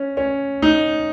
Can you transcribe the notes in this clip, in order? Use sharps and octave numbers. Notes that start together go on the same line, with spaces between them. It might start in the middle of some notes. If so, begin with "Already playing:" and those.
Already playing: C#4
C#4
D#4